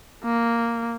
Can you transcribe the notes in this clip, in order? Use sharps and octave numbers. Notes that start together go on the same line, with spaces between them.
A#3